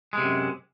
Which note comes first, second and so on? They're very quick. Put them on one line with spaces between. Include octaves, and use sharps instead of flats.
G#3 C3 F#2